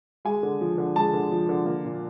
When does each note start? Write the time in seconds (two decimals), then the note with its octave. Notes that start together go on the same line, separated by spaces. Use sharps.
0.25 G#3 G#5
0.43 D3
0.61 F3
0.78 D3
0.96 G#3 A5
1.14 D3
1.31 F3
1.49 D3
1.66 A#3
1.85 A#2